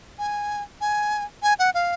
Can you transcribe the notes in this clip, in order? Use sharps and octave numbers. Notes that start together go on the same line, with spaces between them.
G#5
G#5
G#5
F#5
F5